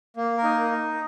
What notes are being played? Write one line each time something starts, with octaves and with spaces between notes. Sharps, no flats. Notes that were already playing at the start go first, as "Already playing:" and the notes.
A#3
A#4
D#4